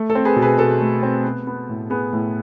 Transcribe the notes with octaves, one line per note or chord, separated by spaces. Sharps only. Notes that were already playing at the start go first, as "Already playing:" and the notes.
Already playing: A3
A4
C4
G#4 B4
B2
G#4 B4
B2 A4
A3
C4
B3
B3
A2
B3 G#4
A2